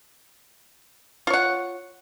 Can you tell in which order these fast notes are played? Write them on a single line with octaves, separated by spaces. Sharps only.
F4 C#5 F#5